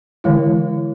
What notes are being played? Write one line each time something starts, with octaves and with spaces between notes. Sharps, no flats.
D3 E3 G#3 E4